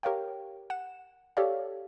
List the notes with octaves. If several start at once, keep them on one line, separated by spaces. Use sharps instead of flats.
G4 A#4 C#5 F5 G5
F#5 E7
G4 A4 C#5 D5 F5